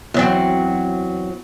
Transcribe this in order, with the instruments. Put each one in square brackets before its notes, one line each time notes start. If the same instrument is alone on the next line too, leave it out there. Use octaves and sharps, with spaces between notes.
[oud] E2 F#3 C4